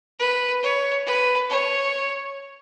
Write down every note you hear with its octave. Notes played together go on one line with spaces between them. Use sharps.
B4
C#5
B4
C#5